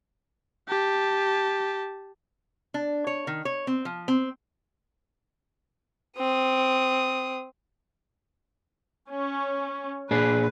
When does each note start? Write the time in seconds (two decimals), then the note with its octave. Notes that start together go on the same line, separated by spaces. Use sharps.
0.69 G4 A5
2.74 D4
3.07 C#5
3.27 D#3
3.45 C#5
3.67 C4
3.85 F3
4.08 C4
6.18 C4 D#6
9.09 C#4
10.11 A#2 D4 G#4 B4